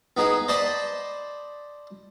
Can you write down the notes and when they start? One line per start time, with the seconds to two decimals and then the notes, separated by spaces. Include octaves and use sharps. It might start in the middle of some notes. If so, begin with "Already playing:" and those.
0.17 B3 D#4 G#4
0.48 C5 D5 D#5 A5 B5